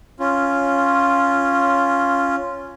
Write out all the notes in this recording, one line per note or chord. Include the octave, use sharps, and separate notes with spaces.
C#4 F4